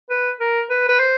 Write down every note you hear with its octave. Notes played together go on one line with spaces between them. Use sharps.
B4
A#4
B4
B4
C5